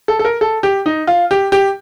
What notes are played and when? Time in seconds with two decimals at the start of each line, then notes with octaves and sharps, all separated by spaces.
0.08 A4
0.19 A4
0.25 A#4
0.41 A4
0.63 G4
0.86 D#4
1.07 F4
1.31 G4
1.52 G4